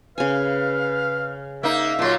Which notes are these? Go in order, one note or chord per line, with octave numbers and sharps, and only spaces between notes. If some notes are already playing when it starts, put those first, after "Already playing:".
C#3 B4 F5 G#5
A#3 D#4 E5
A#2 F#3 F4 A5 C6